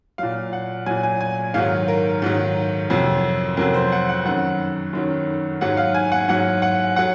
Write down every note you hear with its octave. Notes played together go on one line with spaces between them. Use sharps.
A#2 F#3 F5
F#5
A#2 F#3 G#5
G#5
G#5
G#2 D#3 F#3 F5
A#4
G#2 D#3 F#3
F2 C3 F#3
F2 C3 F#3 A#4
C5
F#5
F#5
F#2 D#3 F#3 F#5
F#2 D#3 F#3
G#2 F#3 F#5
F5
G#5
F#5
G#2 F#3 F#5
F#5
F#3 F#5